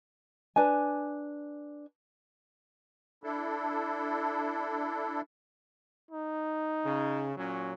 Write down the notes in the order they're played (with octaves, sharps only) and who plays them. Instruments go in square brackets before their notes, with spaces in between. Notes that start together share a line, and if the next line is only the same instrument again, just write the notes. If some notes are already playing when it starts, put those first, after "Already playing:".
[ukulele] D4 B4 G#5
[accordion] D4 E4 A4
[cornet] D#4
[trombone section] C#3
A#2 F#3 C#4